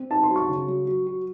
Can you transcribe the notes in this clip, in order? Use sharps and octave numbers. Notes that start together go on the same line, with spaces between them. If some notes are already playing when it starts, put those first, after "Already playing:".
Already playing: C4
D#4 A5
C6
F#3
C#6
C#3
F#3
F#3
F#4